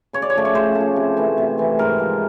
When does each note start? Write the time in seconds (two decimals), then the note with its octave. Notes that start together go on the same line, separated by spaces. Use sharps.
0.13 C#3 C#5
0.22 D5
0.30 C#5
0.35 F3 A3 D5
0.45 C#5
0.55 C#3 C5
0.75 A3
0.81 F3
0.96 C3
1.17 E3 A3
1.38 C3
1.58 E3 A3
1.79 G#2 A#4
2.00 F3 G#3